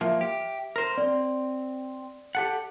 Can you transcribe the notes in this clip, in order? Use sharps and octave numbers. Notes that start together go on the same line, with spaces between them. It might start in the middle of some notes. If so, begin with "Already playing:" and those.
F3 A#3 E5
G4
A#4 C5
C4 D5
G4 A4 F#5